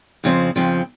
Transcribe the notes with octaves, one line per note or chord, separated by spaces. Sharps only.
F2 C#3 F3 C4
F2 C#3 F3 C4